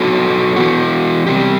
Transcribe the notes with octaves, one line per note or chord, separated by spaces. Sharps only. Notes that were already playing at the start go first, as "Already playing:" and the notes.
Already playing: F#3 B3 F#4 A4
E3 B3 F#4
C3 G3 C4 G4